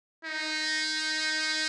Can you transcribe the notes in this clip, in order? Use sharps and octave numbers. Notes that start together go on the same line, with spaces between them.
D#4